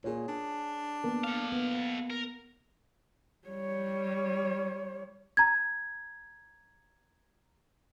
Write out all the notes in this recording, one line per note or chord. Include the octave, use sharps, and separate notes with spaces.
A#2 G#4 C#5
D4
A#3 B3 A#4
A4 F5
B3
A#4
G3 C#5
A#5 G#6